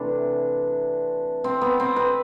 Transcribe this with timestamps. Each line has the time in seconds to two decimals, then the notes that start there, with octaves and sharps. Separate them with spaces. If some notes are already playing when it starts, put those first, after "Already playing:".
Already playing: C3 E3 A3 D4
1.44 C4
1.61 B3
1.80 C4
1.96 B4